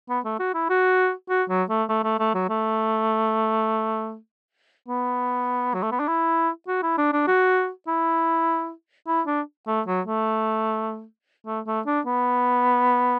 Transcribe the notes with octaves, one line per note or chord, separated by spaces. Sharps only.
B3
A3
F#4
E4
F#4
F#4
F#3
A3
A3
A3
A3
F#3
A3
B3
F#3
A3
B3
D4
E4
F#4
E4
D4
D4
F#4
E4
E4
D4
A3
F#3
A3
A3
A3
D4
B3